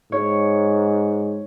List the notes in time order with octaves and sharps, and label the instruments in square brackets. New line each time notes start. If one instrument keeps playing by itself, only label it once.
[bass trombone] G#2 [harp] C#5